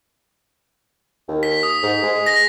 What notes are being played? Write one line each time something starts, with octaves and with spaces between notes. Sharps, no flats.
D#2
B6
D#6
G#2
G#3
A#6